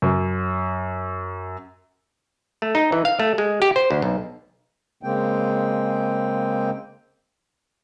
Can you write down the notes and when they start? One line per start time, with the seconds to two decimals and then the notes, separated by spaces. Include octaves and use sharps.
0.02 F#2
2.62 A3
2.75 D#4
2.92 E3
3.05 F5
3.19 A3
3.38 G#3
3.62 G4
3.76 C5
3.91 D2
4.02 B1
5.03 C#3 G#3 A#3 C4 G5